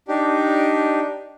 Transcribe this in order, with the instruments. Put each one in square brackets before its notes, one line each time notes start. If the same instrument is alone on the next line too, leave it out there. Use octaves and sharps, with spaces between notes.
[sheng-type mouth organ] D4 D#4 G4